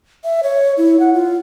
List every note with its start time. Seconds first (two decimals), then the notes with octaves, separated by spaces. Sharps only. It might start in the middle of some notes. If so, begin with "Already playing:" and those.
0.24 E5
0.43 C#5
0.78 E4
1.00 F#5
1.14 F4